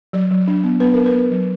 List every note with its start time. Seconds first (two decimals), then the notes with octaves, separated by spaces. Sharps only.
0.13 F#3 D5
0.31 F#3
0.48 D4
0.64 B3
0.80 B3 B4
0.94 B3 A#4
1.06 B4
1.14 B3
1.31 F#3